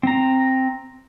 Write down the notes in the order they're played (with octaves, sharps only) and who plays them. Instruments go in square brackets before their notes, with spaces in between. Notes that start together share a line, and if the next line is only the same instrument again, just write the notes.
[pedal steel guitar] C4 A#5